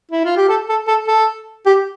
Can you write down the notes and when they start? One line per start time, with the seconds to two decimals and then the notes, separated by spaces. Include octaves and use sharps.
0.12 E4
0.25 F4
0.37 G4
0.49 A4
0.69 A4
0.88 A4
1.08 A4
1.66 G4